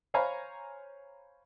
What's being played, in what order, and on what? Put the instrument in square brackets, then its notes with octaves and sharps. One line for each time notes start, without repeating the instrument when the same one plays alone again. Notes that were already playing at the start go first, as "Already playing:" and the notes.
[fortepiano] C5 C#5 F5 G#5 A#5 B5